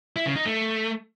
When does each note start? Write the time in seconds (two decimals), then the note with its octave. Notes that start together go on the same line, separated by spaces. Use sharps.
0.16 E4
0.26 C#3
0.36 D#4
0.46 A3